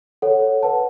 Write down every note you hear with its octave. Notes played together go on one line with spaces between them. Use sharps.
A4 C#5 F#5
B4 F#5 A5